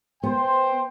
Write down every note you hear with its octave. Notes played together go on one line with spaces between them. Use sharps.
B3 C5 G5